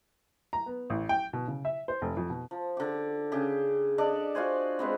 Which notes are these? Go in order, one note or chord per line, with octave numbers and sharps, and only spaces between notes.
A#5
B3
A1
G5
B2
C#3
E5
C5
F1
F2
B2
F3
D3 G4
C#3 G4 G#4
D4 A4 D5 D#5
F4 F#4 C5 G#5
G#3 B3 C4